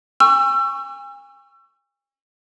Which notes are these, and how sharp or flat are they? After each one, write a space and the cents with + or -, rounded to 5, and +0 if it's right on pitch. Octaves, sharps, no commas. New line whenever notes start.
G#5 -40 C#6 +0 E6 +35